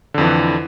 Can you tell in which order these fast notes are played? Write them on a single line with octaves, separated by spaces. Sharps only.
D3 F2 E3